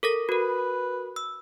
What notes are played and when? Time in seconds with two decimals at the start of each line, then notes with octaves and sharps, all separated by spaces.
0.03 A4 A#4 A#6
0.29 F#4 A#4 B4
1.16 E6